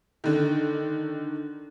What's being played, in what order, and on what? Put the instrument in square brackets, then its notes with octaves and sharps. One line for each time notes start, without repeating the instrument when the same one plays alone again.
[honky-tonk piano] D3 D#3